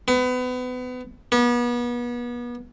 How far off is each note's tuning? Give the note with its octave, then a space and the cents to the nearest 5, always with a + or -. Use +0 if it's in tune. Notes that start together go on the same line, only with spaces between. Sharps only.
B3 +30
B3 -35